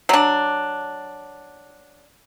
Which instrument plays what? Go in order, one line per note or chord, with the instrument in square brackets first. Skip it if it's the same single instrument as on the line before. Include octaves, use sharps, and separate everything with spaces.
[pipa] F#3 D4